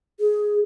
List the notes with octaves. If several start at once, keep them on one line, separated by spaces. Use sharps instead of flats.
G#4